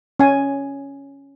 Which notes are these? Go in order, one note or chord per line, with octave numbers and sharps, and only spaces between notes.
C#4 G#5